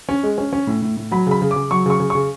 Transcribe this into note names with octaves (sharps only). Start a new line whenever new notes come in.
C#4
G#3
C#4
C#4
A2
A2
A2
F#3 B5
C#3 B5
C#3
D6
C#3
F#3 C#6
C#3 C#6
C#3
C#3 C#6